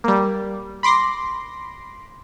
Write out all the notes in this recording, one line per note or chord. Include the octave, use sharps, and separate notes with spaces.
G3 A#3
B5 C6 D6 A#6 C7